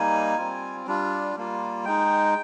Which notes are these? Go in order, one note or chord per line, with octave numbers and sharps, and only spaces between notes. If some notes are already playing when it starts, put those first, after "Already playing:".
Already playing: G3 A#3 D#4 G#5
G3 C4 F4
G3 D4 F4
G3 A#3 F4
G#3 D#4 G5